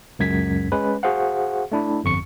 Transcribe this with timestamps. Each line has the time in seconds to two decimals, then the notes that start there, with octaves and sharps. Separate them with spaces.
0.19 C#2 F#2 G#6 B6
0.72 G#3 C#4 B4
1.03 F#4 G#4 C5 F5 F#5
1.72 A3 D4 E4
2.04 G1 F2 C#6 C#7